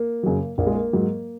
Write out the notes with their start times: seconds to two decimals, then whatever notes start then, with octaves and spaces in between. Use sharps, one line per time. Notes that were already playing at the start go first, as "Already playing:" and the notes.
Already playing: A#3
0.23 F#2 C#3 F#3
0.58 A#1 A#3
0.67 G#3
0.75 A#3
0.93 G#2 F#3